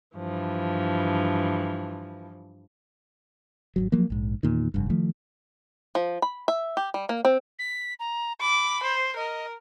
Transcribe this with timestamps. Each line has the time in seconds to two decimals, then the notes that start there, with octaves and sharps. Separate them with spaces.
0.17 G2 E3 F3
3.76 G#1 D#2 F#3
3.92 F3 F#3 A#3
4.10 A#1 G#2
4.43 E2 A#2 D#3
4.74 F1 G2
4.90 D#3 F3 A3
5.95 F3
6.22 B5
6.48 E5
6.77 G4
6.94 G3
7.09 A#3
7.25 C4
7.59 B6
8.00 A#5
8.41 B5 D6
8.83 C5
9.16 A#4 D#5